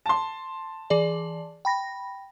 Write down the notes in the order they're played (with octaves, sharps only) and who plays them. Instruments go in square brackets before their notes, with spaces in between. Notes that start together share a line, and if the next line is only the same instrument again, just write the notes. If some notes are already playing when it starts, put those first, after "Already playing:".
[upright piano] A5 C6
[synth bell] E3 G#4 D5
G5 B5 A#6